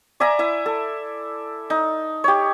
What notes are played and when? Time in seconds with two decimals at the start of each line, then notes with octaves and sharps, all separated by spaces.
0.20 D5 E5 G#5 A#5
0.39 E4 E5
0.66 A4
1.70 D#4
2.24 G4 C#5